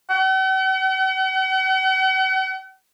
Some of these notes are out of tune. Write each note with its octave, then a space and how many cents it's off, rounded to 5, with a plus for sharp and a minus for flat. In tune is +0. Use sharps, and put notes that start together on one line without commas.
F#5 +45